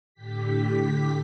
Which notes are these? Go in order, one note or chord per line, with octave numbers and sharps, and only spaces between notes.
A2 D3 G4 B6